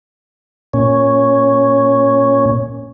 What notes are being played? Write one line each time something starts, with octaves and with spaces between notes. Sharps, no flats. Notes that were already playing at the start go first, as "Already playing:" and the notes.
A#2 C#4